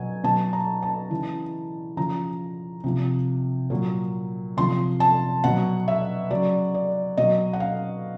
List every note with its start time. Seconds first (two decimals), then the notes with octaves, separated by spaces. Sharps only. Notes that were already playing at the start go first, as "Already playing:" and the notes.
Already playing: B2 F#3 G#5
0.24 B2 F#3 A5
0.53 A#5
0.83 A5
1.10 C#3 E3
1.97 C#3 F3 A#5
2.84 C3 F3
3.70 A#2 F#3
4.57 C3 F3 C6
5.00 A5
5.44 B2 F#3 F#5
5.88 E5
6.30 C#3 F#3 D5
6.74 D5
7.17 B2 F#3 D#5
7.53 F#5
7.60 F5